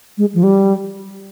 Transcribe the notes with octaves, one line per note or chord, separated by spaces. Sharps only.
G#3
F3
G3